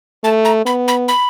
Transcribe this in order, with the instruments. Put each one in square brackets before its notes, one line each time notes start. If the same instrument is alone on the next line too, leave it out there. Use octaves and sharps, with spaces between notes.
[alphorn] A3 [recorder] A5
[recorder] A#5
[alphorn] B3 [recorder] B5
[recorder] B5
B5